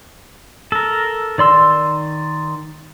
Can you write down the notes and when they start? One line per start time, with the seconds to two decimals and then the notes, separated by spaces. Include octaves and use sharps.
0.72 A4 A#4
1.38 D#3 D5 C6 E6